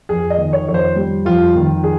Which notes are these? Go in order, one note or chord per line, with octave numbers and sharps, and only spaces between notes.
F2 G#4
D#5
D#3
C#5
F2 C#5
C5
G3
F2 F4
D#3
G#4